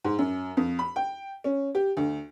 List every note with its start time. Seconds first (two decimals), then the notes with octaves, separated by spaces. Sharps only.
0.04 G#2
0.18 F#2
0.57 F2
0.79 B5
0.96 G5
1.44 C#4
1.75 G4
1.97 D2